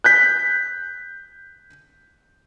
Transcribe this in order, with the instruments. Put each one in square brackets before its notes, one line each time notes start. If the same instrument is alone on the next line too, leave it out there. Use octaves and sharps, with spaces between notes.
[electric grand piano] F#6 G6 B6